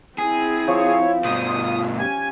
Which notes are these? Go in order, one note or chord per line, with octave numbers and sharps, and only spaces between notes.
C4 E4 G#4
F3 C#5
G2 B2 C5 D#6
F4
C#4 G4 G#5